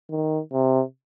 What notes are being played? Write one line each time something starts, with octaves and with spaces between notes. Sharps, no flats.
D#3
C3